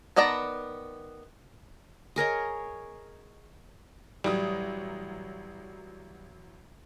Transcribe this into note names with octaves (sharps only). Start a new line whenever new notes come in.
D#3 B3 D5 A5 A#5
G#4 A#4 C#5 D#5
A1 F#3 G3 D#6